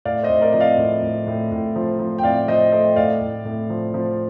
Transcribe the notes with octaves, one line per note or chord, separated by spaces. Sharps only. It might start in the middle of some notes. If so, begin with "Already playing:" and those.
A2 D5 F5
C5 D#5
A2
A#4 D5
F3 D#5
D5 F5
A2
A2
A2
A2
F3
F3
G5
A2 D5 F5
F3 C5 D#5
A3 C5 D#5
A2 D5 F5
A2
A2
F3
F3